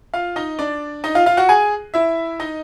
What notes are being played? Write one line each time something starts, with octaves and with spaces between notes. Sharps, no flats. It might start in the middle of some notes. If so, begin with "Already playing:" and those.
F4 F5
D#4 D#5
D4 D5
D#4 D#5
F4 F5
F4 F5
F#4 F#5
G#4 G#5
E4 E5
D#4 D#5